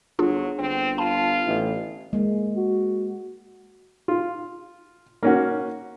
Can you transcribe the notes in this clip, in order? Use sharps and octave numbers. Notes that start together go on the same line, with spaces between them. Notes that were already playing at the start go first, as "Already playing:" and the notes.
G1 F#3 D4 F4 G#4
G1 C4
F4 A5 B5
A1 E4 B4
G#3 A#3
F#4
F4
A#3 C#4 F#4